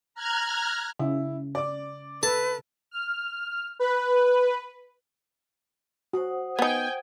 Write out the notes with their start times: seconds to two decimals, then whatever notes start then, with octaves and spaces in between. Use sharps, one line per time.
0.14 A#5 F6 F#6 G#6
0.99 C#3 E4
1.55 D5 D6
2.23 A4 B4 A5
2.91 F6
3.79 B4
6.13 F#4 C5 F#5 D#6
6.59 B3 D#4 G5 G#5